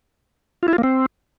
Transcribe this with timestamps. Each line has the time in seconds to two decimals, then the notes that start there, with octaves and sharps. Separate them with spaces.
0.63 F4
0.68 E4
0.73 F4
0.78 A#3
0.83 C4